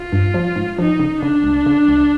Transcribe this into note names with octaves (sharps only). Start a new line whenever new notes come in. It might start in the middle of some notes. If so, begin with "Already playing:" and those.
Already playing: F4
G2
F3
G#2
F3 D#4
C#3
C#3 D4
C#2
C#3
C#2